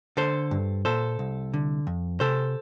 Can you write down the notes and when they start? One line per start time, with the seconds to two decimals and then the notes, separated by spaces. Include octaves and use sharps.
0.17 D3 A4 C5
0.51 G2
0.85 A#2 A4 C5
1.19 C2
1.54 D3
1.87 F2
2.20 C3 A4 C5